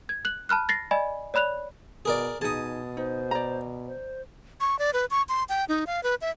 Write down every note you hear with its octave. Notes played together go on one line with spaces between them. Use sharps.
G#6
F#6 F#7
A5 B5 F6 F#6
A6 A#6 C7
D5 D#5 G#5 B5
C#5 D5 B5 F#6 F7
B2 G#4 A#4 D5
B2 D#4 G#4 A5 D#6
D#4 C5
D5 A#5
C5
C#6
D5
B4
C#6
C6
G5
D#4
F5
B4
E5